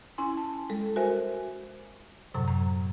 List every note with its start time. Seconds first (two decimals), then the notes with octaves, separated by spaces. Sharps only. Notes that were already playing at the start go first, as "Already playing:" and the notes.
0.18 C#4 E4 G#5 C6
0.37 A5
0.69 G3 G#3 A4
0.96 F#4 A#4 C5 E5 G#5
2.34 F#2 A2 C3 F#3
2.48 A#5